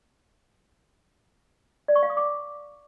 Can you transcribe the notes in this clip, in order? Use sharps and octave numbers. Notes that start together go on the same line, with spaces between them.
D5
C#6
F5
D#6
D6